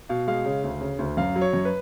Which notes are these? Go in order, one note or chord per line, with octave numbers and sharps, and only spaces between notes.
B2 F5
G#3 F5
C#3
D2
C#3
D2
F#2 F5
F#3
C#5
F#2
B4